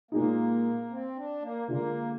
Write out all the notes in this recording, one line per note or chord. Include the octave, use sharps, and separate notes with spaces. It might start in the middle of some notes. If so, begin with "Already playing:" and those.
A#2 G#3 A#3 D#4
C4
D4
A#3
D3 G#3 A#3 D4 F4